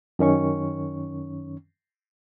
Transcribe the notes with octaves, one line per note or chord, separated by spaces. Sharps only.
F#2 D#3 C#4 C#6